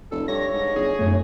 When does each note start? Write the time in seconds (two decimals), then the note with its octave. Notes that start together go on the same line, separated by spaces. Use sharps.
0.11 F1 A4
0.28 G2 C#5 A#6
0.54 G#2
0.76 G1 G#4
0.99 F1 F#2 A3